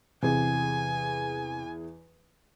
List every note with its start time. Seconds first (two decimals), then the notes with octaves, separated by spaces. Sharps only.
0.23 E2 C3 G#4 G#5